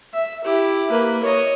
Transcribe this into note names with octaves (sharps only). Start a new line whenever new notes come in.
E5
E4 G4
A#3 B4
C#5 D#5